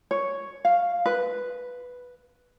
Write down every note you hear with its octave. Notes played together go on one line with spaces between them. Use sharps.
C#5
F5
B4